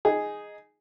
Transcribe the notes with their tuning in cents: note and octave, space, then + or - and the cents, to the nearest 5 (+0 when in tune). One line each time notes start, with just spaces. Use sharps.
D#4 +0 G#4 +0